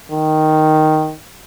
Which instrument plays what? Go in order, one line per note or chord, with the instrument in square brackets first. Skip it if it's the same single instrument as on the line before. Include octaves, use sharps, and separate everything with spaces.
[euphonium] D#3